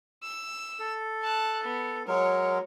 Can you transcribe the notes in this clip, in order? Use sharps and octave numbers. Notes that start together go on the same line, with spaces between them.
E6
A4
A5 F#6
B3
F#3 G#3 A#4 C#5